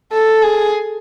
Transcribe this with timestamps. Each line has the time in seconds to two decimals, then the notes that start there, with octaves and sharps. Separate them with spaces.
0.13 A4
0.43 G#4